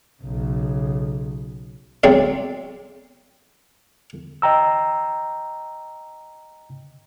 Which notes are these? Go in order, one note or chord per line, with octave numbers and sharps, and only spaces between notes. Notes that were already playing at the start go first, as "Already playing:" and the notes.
B1 C#3
B1 F#3 G#3 C4 D5
D#5 G5 A#5 E6